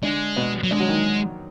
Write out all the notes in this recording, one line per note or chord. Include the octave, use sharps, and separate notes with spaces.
D3 G#3 D4
B2 B3
F#3
D3 G#3 D4
F#3 F#4
D#3 D#4